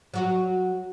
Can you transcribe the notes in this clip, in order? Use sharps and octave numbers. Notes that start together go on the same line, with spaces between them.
F#3 F#4